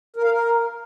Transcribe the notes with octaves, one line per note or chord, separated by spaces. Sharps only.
A#4
F5
A#4